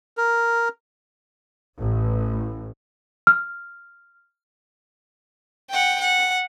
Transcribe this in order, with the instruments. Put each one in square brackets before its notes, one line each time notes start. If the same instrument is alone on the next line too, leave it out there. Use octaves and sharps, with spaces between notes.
[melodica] A#4
[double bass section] A1
[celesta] F6
[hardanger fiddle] F#5 G5
F#5